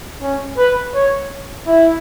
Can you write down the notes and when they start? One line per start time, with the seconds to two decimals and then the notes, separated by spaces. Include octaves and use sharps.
0.22 C#4
0.58 B4
0.95 C#5
1.67 E4